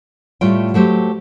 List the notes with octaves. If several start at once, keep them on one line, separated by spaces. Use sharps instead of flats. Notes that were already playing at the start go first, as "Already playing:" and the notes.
A2 G3 A3 F4 C#5 G5
F#3 A3 G4 C5